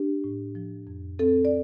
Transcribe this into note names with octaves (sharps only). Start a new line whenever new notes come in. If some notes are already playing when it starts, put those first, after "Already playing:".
Already playing: D4 G4
A2
F3
F2
C4 A4
D5